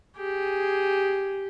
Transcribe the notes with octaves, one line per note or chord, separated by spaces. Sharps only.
G4 G#4